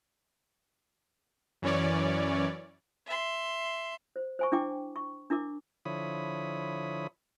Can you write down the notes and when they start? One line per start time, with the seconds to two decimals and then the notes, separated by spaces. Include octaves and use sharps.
1.62 F#2 E3 C#4 C#5 D5
3.06 E5 C6
4.16 C5
4.39 C5 G#5 C#6
4.52 D4 E4 G5 D6
4.96 C#6
5.30 D4 E4 A#4 D6
5.85 D3 F3 E4 C#5 B5 D#6